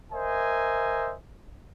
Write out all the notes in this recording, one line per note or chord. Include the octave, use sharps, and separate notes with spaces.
A#4 C5 D#5 E5 G#5